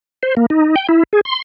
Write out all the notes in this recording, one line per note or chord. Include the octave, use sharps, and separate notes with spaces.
C5
A#3
D#4
G5
E4
G#4
C6